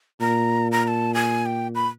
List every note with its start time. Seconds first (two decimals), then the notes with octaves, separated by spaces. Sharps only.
0.21 A#2 A#5
0.72 A#5
0.84 A#5
0.88 A5
1.14 G#5
1.46 G5
1.75 B5